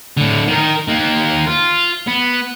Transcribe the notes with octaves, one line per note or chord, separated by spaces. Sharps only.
A2 D3
D#3 A#4
D#3 A#3
F4
B3